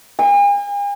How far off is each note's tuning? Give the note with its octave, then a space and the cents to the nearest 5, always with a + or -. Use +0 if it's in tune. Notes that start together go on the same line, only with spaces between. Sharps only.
G#5 -45